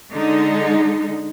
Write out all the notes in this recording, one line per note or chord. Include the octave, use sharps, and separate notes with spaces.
D3 G#3 D#4